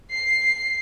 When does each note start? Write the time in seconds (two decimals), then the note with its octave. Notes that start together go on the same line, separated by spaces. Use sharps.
0.13 C7